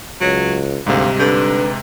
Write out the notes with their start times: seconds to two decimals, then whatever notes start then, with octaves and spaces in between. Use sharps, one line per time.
0.21 C#2 F#3
0.87 D2 G#2 C3 G3 F5
1.19 D3 B4